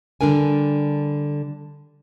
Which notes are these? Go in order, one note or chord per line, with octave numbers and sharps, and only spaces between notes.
D3 G3 D4 A#4 G#5